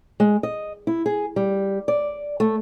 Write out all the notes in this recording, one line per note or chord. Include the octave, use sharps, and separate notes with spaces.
G#3
D#5
E4
G#4
G3
D5
A3